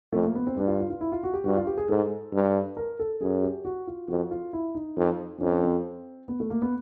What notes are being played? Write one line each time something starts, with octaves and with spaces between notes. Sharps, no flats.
F2 A3
A#3
B3
C4
G2 D4
F4
F4
F4
E4
F4
F#4
G4
G2 F#4
F4
G4
G#4
G#2 A4
G2
A#4
A4
F#2 G#4
G4
F#4
F4
F2 F#4
F4
E4
D#4
F2
F2 C#4
C4
B3
A3
A#3
B3